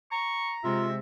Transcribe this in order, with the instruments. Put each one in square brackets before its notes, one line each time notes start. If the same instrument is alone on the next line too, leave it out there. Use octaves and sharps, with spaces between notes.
[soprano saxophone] A#5 [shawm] C#6
[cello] C3 G#3 [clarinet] F4 [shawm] E5